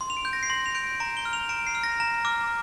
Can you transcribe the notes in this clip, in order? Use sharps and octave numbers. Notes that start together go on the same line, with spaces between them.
C6
F7
D7
G6
A#6
C7
C6 A#6
F7
G6 D7
A#5 D7
G7
F6
F7
A#5 D7
C7
F6
A#6
A#5
D6 F6